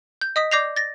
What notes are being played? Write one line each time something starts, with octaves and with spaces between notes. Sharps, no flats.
G6
D#5 D#6 B6
D5 D6 G6 A#6 C7 F7
A6 A#6